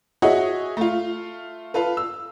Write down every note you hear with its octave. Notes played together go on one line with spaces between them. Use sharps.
F#4 G#4 C#5 D#5 E5 F#5
A3 F4
F4 A4 B4
E6